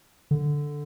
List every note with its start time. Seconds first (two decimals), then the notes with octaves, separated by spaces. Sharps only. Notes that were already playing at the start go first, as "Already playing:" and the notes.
0.31 D3